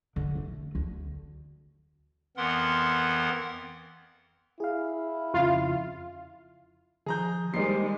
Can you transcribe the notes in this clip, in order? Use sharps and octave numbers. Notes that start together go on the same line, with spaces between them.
D3
A3
D2
F2 E3 B3 A#4 F#5 C6
E4 G#4 F5
F2 C#3 F3 F4 F5
D#3 F3 G#4 A#5 G6
D#3 G3 G#3 A#3 D#4 C5 C7